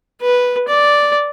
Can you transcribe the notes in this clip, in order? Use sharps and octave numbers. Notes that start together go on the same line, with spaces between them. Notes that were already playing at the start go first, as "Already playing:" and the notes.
B4
D5